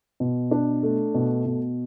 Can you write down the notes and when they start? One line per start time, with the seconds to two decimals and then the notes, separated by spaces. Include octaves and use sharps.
0.20 B2
0.51 D4
0.83 A3
1.14 B2
1.46 B2